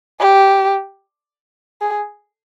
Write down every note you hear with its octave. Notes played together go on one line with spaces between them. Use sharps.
G4
G#4